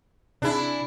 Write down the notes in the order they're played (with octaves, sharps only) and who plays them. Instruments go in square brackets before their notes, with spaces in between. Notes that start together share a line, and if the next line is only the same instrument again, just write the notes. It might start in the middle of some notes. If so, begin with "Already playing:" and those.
[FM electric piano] C3 G#4 [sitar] D4 E4